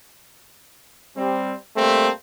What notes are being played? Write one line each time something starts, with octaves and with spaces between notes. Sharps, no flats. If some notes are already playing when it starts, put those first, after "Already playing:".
G3 C4
G3 A3 A#3 C4